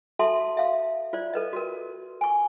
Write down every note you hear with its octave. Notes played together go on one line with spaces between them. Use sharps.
F#4 A4 E5 A5 C6
E5 F5
F4 C5 D5
A4 B4 D#5
F#4 A#4
G#5 C#6